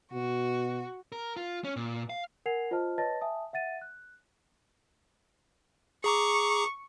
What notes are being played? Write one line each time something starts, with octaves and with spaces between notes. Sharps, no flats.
B2 F#4
A#4
F4
C#4
A#2
F5
A#4 F#5 G#5 G#6 C7 F7
F4 C5 D#5 A5 F6
B4 C#5 D#5 A5 A6 A#6
E5 G#5 A5 D#6
E5 F#5 A6 D#7
F#6
G#4 A#5 C#6 D6